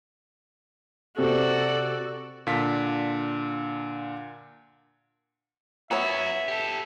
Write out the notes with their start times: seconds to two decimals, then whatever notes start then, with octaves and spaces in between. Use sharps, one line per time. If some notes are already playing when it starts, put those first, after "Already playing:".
1.18 C3 F#4 A4 D5
2.47 A#2 D3 D4 F5 B6
5.91 B3 C#4 E4 F#4 C#5 E5
6.48 G4 A4